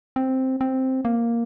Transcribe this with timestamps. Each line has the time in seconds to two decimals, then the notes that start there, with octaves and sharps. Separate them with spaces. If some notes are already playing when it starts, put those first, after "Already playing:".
0.16 C4
0.61 C4
1.05 A#3